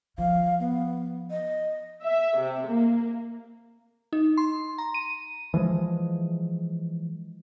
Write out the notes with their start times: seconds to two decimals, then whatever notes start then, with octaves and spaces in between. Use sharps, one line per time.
0.18 F3 F5
0.60 B3
1.31 D#5
2.03 E5
2.37 C3
2.68 A#3
4.13 D#4
4.38 C6
4.78 A#5
4.94 D#7
5.54 E3 F3 G#3